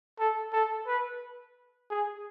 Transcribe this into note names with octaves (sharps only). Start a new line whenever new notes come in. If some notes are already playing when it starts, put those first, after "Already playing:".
A4
A4
B4
G#4